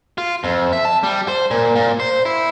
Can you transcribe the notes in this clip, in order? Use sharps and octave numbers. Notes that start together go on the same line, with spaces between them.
F4
F2
E5
A5
G3
C5
A#2
A#2
C5
E4